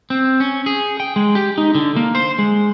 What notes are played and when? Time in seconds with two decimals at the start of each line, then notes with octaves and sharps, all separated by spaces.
0.10 C4
0.40 C#4
0.66 G#4
1.00 G5
1.16 G#3
1.35 G4
1.58 D#4
1.75 D3
1.96 A#3
2.15 C5
2.39 G#3